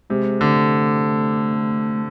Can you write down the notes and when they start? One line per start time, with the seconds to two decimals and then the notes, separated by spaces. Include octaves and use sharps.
0.10 C3 G#3
0.41 D3 A3